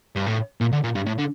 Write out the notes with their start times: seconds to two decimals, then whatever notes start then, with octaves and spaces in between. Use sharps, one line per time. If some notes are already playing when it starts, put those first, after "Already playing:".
0.16 G2
0.26 A2
0.61 A#2
0.73 D3
0.84 A#2
0.95 G2
1.07 A2
1.18 D3